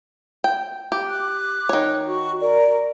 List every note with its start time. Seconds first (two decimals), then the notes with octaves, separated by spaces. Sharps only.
0.44 G5
0.92 G4
1.08 D6 F#6
1.69 D#3 C#5
2.08 F#4 C#6
2.41 A#4 D5